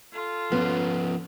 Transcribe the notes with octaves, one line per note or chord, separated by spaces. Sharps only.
F4 A4
F3 B3 C#4